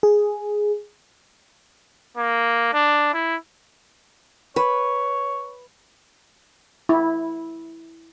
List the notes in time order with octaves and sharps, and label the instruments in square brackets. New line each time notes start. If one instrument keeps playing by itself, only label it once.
[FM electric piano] G#4
[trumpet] A#3
D4
E4
[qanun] B4 [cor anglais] C#5
[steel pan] E4